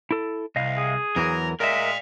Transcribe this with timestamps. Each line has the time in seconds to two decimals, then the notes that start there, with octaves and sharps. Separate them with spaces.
0.11 E4 A4
0.56 C2 D#5 F5
0.77 G#4
1.16 E2 E3 F#3 A#4
1.60 G#3 A#4 D5 E5 F5